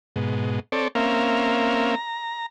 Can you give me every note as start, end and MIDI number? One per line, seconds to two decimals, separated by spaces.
0.16 0.60 44
0.16 0.60 47
0.72 0.88 60
0.72 0.88 69
0.72 0.88 73
0.72 0.88 74
0.95 1.95 58
0.95 1.95 60
0.95 1.95 61
0.95 1.95 70
0.95 1.95 76
0.95 1.95 77
1.95 2.46 82